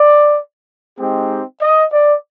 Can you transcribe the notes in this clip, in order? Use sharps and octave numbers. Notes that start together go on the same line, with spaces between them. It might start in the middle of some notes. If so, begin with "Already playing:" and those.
Already playing: D5
G#3 C4 D#4 G4
D#5
D5